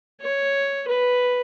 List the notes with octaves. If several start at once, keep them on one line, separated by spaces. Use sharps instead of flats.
C#5
B4